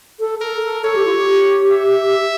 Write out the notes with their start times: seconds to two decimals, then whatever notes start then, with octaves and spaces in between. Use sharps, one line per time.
0.20 A4
0.41 A4 A#4
0.63 A4
0.84 A4 C#5
0.95 G4
1.05 F4
1.15 G4
1.71 E5